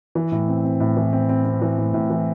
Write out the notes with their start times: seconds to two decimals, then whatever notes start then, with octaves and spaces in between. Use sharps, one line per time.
0.15 E3
0.32 A2
0.48 C4
0.64 C4
0.80 A2
0.97 E3
1.13 C4
1.29 C4
1.45 C4
1.62 E3
1.78 A2
1.94 A2
2.10 E3